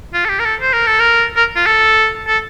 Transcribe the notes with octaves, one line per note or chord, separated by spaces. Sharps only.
F4
A4
G4
A#4
A4
C5
A#4
A4
A#4
A#4
F4
A4
A4